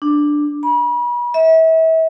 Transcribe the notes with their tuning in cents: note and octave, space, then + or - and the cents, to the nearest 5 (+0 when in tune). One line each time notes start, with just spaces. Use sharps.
D4 +5
B5 -40
E5 -35